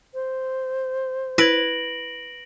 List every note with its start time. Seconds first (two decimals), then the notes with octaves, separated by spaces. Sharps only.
0.14 C5
1.38 E4 B4 G#6 A#6 D7 F#7